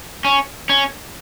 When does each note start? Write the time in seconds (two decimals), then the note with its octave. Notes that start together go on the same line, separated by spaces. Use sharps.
0.25 C#4
0.69 C#4